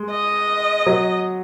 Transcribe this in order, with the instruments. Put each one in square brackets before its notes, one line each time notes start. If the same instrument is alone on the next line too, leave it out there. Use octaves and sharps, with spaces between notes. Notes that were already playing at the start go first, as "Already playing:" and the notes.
Already playing: [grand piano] G#3
[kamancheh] D#5
[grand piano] F#3